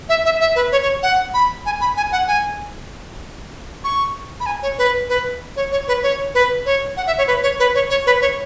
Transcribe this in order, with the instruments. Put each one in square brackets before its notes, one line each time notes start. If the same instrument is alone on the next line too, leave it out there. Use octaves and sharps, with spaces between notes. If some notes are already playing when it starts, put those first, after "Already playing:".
[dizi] E5
E5
E5
B4
C#5
C#5
F#5
B5
G#5
B5
G#5
F#5
G#5
C#6
B5
G#5
C#5
B4
B4
C#5
C#5
B4
C#5
B4
C#5
F#5
E5
C#5
B4
C#5
B4
C#5
C#5
B4
C#5